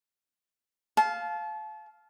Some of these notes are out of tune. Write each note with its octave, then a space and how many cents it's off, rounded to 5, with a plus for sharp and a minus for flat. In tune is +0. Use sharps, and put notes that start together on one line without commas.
F5 +0 A5 -30